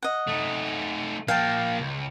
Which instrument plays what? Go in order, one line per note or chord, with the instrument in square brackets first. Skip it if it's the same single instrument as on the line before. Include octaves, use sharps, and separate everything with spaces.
[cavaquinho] D#5 F#5
[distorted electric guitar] A3 D#4
[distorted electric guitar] F3 A#3 [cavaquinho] F5 G5 A5
[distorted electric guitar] C#2